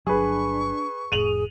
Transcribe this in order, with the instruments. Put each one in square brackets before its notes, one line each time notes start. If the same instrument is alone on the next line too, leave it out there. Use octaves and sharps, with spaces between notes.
[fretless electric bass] G1 F#3 [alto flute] D4 [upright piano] G#4 B4 [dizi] C#6
[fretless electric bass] F1 A2 [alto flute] G#4 [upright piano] D#7 F7 F#7